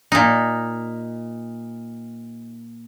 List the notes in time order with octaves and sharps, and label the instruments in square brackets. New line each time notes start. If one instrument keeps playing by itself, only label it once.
[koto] A#2 D#4